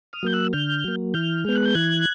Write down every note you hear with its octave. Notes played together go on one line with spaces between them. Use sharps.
D#6 F6
F#3 A#3 G6
E6 F#6
D3 F6 G6
F#3 A#3
E3 F6 G6
G#3 B3
F#6
G6
E3 F#6 G#6